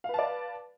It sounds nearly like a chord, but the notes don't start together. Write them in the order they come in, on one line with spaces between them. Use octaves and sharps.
F5 B4 A5 D5